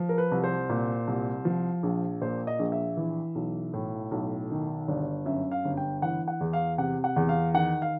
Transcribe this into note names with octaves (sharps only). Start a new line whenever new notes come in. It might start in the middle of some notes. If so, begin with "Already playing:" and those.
Already playing: F3
A#4
B4
C2
C5
A#2
C2
F3
A#1
A#2 C5
D#5
A#1
E5
E3
B1
A2
B1
D#3
G1 D5
F#2 E5
F5
G1
G5
E3 F#5
F#5
E2
F5
C3 F#5
F#5
E2
F5
D#3 F#5
F5